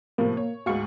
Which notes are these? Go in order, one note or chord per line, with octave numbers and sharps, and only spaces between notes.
A2 C3 F3 A#3
C#5
D2 G#2 F#4 F5 C#6